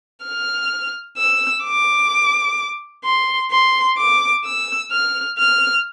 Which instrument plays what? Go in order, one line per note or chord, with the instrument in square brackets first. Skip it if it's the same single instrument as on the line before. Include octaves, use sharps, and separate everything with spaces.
[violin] F6
E6
D6
C6
C6
D6
E6
F6
F6